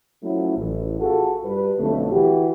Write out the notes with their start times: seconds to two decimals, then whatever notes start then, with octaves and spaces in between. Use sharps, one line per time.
0.23 F3 F#3 A3 C#4 E4
0.57 A1
1.00 F4 F#4 G#4 A4
1.45 G2 B4
1.78 B1 F2 D3 A3
2.11 E3 F#4 G4